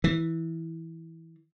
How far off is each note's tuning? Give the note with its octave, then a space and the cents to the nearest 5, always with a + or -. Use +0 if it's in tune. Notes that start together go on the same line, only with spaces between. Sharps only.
E3 -10